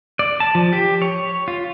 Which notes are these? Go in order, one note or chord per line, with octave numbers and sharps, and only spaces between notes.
D5
A5
F3
G4
C#5
F4